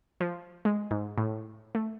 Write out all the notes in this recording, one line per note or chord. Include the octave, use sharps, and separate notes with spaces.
F3
G#3
G#2
A2
A3